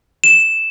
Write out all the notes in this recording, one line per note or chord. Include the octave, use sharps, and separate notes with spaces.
E7